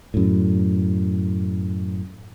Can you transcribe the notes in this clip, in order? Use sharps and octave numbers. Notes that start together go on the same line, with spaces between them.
F#2 A2